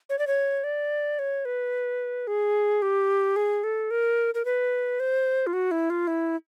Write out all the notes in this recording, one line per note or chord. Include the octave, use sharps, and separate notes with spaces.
C#5
D5
C#5
D5
C#5
B4
G#4
G4
G#4
A4
A#4
A#4
B4
C5
F4
F#4
E4
F4
E4